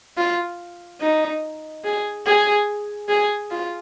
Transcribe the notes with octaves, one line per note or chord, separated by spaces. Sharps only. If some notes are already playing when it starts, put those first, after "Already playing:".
F4
D#4
G#4
G#4
G#4
F4